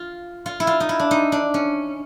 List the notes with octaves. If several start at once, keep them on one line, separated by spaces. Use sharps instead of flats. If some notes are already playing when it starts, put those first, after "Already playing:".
Already playing: F4
F4
E4
F4
D#4
E4
D4
D#4
D4
C#4